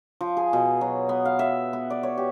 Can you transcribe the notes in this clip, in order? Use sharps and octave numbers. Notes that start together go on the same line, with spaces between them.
F3
G#4
B2
F#3
B3
F5
E5
B3
D5
C#5
G4